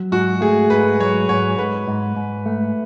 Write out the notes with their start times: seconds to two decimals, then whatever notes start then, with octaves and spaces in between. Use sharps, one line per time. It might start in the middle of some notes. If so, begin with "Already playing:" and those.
Already playing: F#3
0.12 G#2 F#4
0.41 A3 G#4
0.70 G#2 B4
1.00 F#3 C#5
1.29 G#2 C#5
1.58 G#2 B4
1.88 G#2
2.16 G#2
2.46 A3